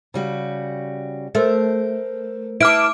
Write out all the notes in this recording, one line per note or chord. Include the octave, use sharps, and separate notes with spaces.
C#3 G3 F#4
A3 A#4 C5
E4 B4 A5 D6 F6 D7